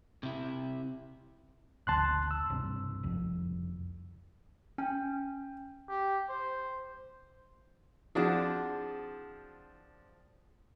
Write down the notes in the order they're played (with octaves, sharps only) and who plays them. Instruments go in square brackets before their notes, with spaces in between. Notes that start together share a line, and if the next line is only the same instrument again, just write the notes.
[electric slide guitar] C3 E4
[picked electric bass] F#1 D2 [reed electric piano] A5 C6 F#6
[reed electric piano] E6
[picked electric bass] B1 G2 C3
F#1 C2 F2
[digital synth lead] C#4 [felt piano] G5
[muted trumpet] G4
C5
[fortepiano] F3 C4 D4 [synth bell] E4 F#4 F#5 [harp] G#4